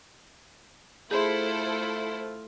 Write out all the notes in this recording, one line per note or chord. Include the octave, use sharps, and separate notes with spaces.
A3 E4 F4 G#4 A4 C5 C6